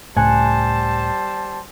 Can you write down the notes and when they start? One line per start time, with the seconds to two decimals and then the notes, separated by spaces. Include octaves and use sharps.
0.17 C#2 A2 G3 C5 G#5 A5 F#6 C#7